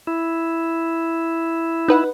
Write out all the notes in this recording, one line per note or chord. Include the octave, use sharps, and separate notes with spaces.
E4
D#4 B4 F#5